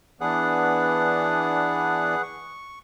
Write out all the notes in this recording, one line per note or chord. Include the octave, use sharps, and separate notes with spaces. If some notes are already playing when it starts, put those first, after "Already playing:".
E3 B3 D4 G#4 B4 F#5
C#6